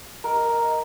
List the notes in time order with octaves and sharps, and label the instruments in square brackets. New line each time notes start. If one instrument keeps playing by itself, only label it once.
[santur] A#4 [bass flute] D#5